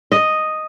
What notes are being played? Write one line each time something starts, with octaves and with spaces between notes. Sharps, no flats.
D#5